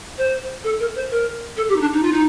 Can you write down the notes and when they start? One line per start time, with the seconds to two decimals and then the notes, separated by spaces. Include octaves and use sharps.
0.18 C5
0.64 A4
0.80 A#4
0.96 C5
1.11 A#4
1.57 A4
1.69 G4
1.76 D#4
1.81 D4
1.93 D#4
2.03 F4
2.12 D#4